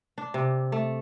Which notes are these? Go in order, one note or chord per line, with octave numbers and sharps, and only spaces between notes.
D4
C3
A3